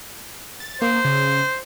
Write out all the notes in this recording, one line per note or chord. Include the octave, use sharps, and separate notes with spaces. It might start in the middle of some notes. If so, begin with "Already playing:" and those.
A6
A#3 C5
C#3